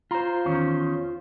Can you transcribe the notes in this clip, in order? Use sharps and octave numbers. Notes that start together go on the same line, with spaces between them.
F4 C5 A#5
E2 D#3 C#4